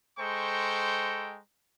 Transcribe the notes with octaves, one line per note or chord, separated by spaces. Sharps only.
G#3 A4 C5 G5 A#5 C#6